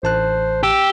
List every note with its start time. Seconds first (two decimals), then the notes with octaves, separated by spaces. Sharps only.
0.03 A1 C5 A5 F#6
0.63 G4 E6